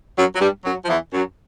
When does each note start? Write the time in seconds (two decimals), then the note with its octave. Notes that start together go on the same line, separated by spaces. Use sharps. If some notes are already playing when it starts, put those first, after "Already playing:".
0.17 F#2 F#3
0.35 F#3
0.41 G2 G3
0.65 F#2 F#3
0.85 F3
0.89 E2 E3
1.13 F#2 F#3